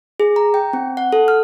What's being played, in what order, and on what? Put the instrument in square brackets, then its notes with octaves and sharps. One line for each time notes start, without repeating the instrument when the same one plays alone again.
[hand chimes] G#4
A#5
G5
C4
F#5
A4
F6